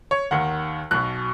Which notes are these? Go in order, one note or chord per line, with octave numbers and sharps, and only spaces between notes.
C#5
D#2 D#3 F#5
B1 B2 F#6